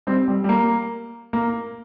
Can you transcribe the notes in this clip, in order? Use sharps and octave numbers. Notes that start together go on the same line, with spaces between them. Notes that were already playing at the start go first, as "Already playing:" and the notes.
G3 C4
G3
G3
A#3
A#3